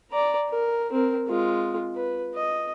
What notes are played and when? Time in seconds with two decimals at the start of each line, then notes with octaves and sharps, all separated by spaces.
0.11 D5 A#5
0.50 A#4
0.92 C4 A#4
1.27 G#3 F4
1.96 B4
2.34 D#5